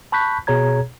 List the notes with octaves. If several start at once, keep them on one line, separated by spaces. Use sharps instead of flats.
A5 B5 C#6 F#6 G6 B6
B2 G#4 C#5 A#5 G#6